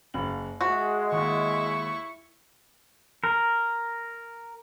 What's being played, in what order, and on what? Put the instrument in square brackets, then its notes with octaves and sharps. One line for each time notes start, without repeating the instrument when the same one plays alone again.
[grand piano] F#1 F5 F#7
[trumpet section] G#3 [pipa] F#4 [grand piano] E5
[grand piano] D#2 [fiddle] E4 C#6
[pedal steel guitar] A#4